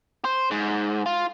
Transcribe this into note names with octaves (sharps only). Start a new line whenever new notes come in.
C5
G#2
F4